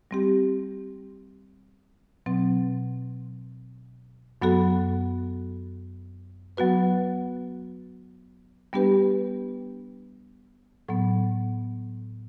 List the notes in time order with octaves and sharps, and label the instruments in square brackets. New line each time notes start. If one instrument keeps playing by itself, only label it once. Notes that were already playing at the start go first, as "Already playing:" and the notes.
[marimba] G3 C4 G4
B2 F#3 C4
F#2 F#3 B3 F#4 A4
F#3 B3 F#4 B4
G3 B3 D4 G4 B4
A2 F#3 B3